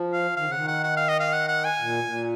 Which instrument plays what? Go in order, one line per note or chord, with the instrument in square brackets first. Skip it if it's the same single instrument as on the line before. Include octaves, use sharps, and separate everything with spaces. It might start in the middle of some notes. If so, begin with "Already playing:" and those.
Already playing: [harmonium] F3
[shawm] F5
[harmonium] D#3 [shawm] F5
[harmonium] C#3
[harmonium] D#3 [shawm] F#5
[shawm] F#5
F#5
F5
D#5
F5
F#5
F#5
G#5
[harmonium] A#2
A#2